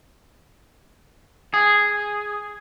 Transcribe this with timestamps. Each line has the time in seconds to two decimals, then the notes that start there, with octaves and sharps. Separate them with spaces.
1.54 G#4